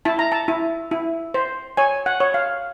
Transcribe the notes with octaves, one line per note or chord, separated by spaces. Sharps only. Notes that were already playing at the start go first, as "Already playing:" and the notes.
E4 A5
A#5
A5
E4
E4
C5
C#5 G#5
F#5
C#5
F5